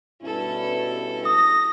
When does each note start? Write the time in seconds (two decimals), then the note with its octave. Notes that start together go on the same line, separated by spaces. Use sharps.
0.22 G2 B2 C#4 E4 A4
1.25 D#6 A#6